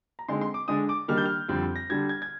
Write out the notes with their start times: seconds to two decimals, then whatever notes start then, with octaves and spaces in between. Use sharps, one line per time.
0.19 A#5
0.28 D3 G#3 C4 D#4 C6
0.41 C6
0.54 D6
0.68 D3 G#3 D4 D#6
0.89 D6
1.08 D#3 G3 A#3 D4 F6
1.17 G6
1.25 F6
1.48 F2 D3 G3 C4
1.76 A#6
1.89 D3 G3 D4 G#6
2.09 G#6
2.22 G#6